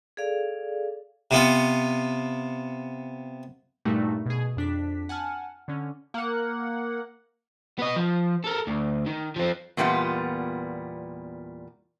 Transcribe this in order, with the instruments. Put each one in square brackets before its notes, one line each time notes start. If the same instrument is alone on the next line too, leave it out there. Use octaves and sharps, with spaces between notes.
[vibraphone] G#4 A4 D5 F5
[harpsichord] C3 B3 F4
[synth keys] G2 A#2 G3 A3 D#4 F#4
B2 G#4
F2 D4 B6
F#5 G#5 A5 F6
D3 C#4
[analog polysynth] A#3 F#5
[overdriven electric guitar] B3 D#5
F3
A4 A#4
D2
D#3
F3 C4
[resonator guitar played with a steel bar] E2 A#2 G3 B3 F4